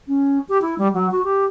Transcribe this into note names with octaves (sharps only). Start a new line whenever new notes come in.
C#4
G4
E4
G3
F#3
F#4
G4